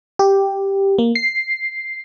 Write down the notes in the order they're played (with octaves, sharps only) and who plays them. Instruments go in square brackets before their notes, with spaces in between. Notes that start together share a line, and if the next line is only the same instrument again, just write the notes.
[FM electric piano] G4
A#3
C7